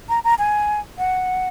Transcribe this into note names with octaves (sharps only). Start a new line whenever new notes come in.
A#5
A#5
G#5
F#5